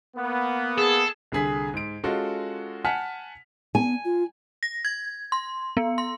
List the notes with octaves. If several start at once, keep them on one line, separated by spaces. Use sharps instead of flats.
A#3 B3
G#4 A4
C2 D3 G#4 B6
G#2 D7
G#3 C#4 F4 F#4 A4
F#5 G#5 A5 F6 B6
B3 G#5
F4
A#6
G#6
C6
B3
C6